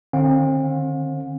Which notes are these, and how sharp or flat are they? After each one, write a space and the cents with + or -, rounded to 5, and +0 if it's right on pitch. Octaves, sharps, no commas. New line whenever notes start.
D3 +40 C4 +35 F5 +45